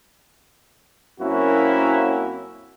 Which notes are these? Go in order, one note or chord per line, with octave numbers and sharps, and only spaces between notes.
F#2 A#3 C4 C#4 E4 F#4